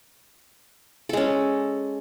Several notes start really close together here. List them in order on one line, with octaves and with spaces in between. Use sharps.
A4 G#3 C#4